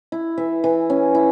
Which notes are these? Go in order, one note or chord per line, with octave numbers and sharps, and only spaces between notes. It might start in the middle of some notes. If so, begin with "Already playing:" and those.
E4
E3 E5
E3
C#4
E4